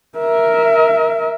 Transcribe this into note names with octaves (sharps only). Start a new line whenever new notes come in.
A#4 E5